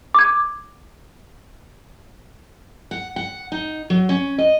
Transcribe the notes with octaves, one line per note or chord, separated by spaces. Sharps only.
D6 G#6
F#5
F#5
D#4
F#3
C#4
D#5